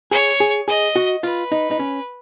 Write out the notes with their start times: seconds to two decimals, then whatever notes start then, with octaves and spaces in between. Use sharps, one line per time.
0.11 G#4 C#5
0.40 G#4
0.68 G#4 D#5
0.96 F#4
1.23 F4 B4
1.52 D#4
1.71 D#4
1.79 C#4